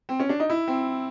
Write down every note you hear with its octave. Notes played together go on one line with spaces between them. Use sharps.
C4
C#4
D4
D#4
E4
C4